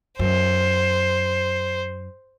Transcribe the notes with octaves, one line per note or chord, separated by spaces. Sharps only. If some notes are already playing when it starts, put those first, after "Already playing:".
F#2 C5